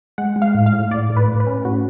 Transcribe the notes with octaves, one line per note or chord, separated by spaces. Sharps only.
G#3 F#5
G#3
F5
A2
F5
A2
A2 D5
A2
B4
A2
B4
C#4
A2 F#4